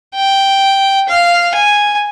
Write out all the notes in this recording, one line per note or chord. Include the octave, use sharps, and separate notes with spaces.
G5
F5
G#5